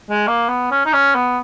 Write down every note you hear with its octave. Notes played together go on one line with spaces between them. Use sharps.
G#3
A#3
B3
C#4
D#4
C#4
B3